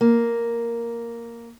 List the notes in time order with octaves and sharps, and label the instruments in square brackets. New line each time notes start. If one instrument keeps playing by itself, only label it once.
[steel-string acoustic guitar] A#3